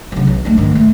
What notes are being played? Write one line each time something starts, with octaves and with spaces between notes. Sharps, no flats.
C#3 F#3
B1
A3 D4
G#2 D#3
C#2 A3